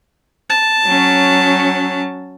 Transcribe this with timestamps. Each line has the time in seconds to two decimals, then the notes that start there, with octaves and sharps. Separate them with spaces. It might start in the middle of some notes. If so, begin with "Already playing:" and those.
0.50 A5
0.86 F#3 C#4